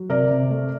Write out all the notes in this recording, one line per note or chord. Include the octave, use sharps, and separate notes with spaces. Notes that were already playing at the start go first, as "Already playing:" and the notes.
Already playing: F#3
C3 A#4 D5
C3
A3